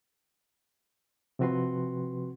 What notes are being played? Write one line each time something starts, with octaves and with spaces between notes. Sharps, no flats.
C3 F3 C4 F#4 B4 C6